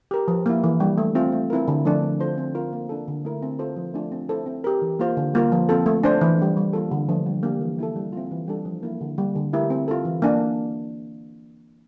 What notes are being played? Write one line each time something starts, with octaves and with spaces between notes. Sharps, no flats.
G4 A#4
F3
A#3 E4
E3
G3 D4
A3
C4 F4
A3
C4 E4 A#4
D3
F3 A3 D4
C4
F4 A4 C5
C4
F4 A#4
A#3
D4 A4
D3
A3 E4 A#4
C4
F4 A4 C5
F3
A3 D4 F4
C4
E4 A4 C5
C4
G4 A#4
E3
A#3 F4 C5
D3
G3 A#3 F4 A#4
F3
C4 F4 A4
A3
D4 A4 C5
E3
G3 D4
G3
A#3 F4 A4
D3
F3 A3 D4
G3
A#3 D4 G4
E3
A#3 E4 A4
G3
C4 F4
E3
G3 D4 A4
F3
A#3 E4
D3
G3 A#3
D3
A3 E4 G4 A#4
C4
F4 A4
E3
A#3 D4